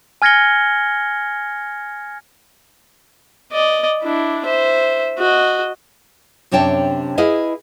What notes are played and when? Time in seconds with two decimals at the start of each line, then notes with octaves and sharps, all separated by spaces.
0.22 G#5 F6 G#6 A#6 C#7 G7
3.52 D5 D#5
4.03 D4 E4
4.46 C5 E5
5.19 F#4 D#5
6.51 F#2 C3 D4 C#5 G5 A5
7.18 E4 G#4 B4 D#5 F5